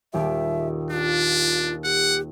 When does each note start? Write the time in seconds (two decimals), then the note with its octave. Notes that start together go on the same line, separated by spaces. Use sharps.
0.13 D#1 D#2 G4 E5
0.91 D4 F4
1.84 G4 F#5